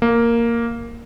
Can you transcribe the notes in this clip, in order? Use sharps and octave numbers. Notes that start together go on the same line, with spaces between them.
A#3